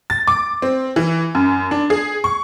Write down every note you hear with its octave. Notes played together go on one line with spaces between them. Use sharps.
A6
D6
C4
E3
F#2
D4
G#4
C#6